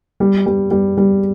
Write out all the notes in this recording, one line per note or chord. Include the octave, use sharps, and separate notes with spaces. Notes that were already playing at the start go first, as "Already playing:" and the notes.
G3
G3
G3
G3